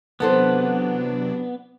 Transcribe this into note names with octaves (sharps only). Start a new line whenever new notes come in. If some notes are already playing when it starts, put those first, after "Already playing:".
C3 E3 F#3 B3 D4 A4 C5